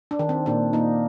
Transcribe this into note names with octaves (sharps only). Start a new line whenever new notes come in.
D4
D#3
C4
A#2 D4
A#3 D#4